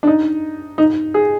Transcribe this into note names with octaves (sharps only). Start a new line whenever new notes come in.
D4
D#4
D#4
G#4